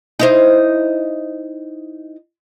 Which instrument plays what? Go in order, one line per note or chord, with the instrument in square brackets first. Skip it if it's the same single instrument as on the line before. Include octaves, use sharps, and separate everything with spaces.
[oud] D#4 E4 C5